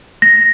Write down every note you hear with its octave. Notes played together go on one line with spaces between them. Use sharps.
A#6